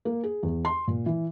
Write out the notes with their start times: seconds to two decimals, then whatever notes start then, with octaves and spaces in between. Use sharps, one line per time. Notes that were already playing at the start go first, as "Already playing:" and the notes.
0.05 A#3
0.23 G#4
0.43 E2
0.65 C6
0.88 A#2
1.06 E3